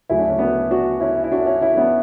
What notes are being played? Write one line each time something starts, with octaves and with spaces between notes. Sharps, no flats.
D2 C#3 F#3 E4
D4
C#4
B3 D4
D4 F#4
C#4 E4
E4
D4 F#4
C#4 E4
C#4 E4
B3 D4